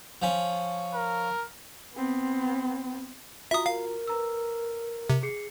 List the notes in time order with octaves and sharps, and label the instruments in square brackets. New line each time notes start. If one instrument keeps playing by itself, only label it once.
[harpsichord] F3 C#4
[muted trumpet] A#4
[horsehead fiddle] B3 C4
[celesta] F4 F#4 A#5 [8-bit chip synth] E5 D#6
[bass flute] A#4 [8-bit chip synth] F5
[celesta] B4 A#5 E6
[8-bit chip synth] C3
[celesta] G#4 C7 C#7